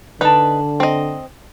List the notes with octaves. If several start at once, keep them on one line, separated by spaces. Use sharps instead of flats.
D3 D#4 B4 D5 A5
C4 D#5